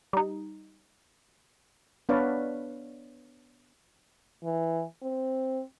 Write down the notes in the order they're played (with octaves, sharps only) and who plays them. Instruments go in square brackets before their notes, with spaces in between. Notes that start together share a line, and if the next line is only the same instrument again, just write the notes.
[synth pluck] G3 D#4
[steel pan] B3 D4 B4 C#5 D5 F5
[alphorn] E3
C4